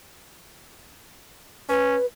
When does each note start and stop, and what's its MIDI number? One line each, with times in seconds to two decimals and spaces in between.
1.69 1.96 61
1.69 2.05 71